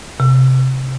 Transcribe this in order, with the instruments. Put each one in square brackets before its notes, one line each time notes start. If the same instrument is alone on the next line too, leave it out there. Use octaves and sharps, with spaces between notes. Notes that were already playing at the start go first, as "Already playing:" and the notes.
[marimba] C3